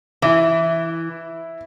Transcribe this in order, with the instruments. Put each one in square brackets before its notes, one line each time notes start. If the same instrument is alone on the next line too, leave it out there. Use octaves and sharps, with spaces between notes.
[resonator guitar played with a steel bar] E3 [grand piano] E4